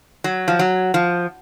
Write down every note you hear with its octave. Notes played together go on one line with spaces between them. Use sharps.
F#3
F3
F#3
F3